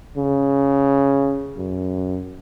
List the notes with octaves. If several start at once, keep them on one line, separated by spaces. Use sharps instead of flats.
C#3
F#2